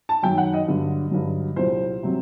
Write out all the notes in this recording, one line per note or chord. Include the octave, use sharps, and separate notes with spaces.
A5
F#2 D#3 F#3 G5
F#5
D#5
G2 D3 F#3
G2 D3 F#3
C2 A#2 F#3 C5
C3 F#3